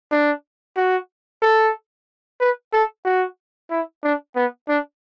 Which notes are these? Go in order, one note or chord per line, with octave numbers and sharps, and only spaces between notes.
D4
F#4
A4
B4
A4
F#4
E4
D4
B3
D4